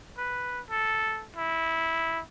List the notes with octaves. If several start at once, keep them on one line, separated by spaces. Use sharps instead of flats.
B4
A4
E4